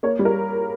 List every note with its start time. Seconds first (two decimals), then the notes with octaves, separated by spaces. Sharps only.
0.03 A#3 C#5
0.19 G3
0.25 A#4